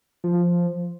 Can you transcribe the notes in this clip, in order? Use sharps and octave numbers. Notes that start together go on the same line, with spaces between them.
F3